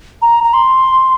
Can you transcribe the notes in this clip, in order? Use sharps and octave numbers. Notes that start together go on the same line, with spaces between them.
A#5
A#5
C6